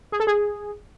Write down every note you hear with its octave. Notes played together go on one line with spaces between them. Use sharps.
G#4
A4
G#4